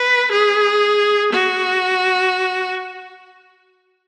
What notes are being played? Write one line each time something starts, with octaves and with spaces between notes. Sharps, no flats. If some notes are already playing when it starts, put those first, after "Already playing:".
Already playing: B4
G#4
F#4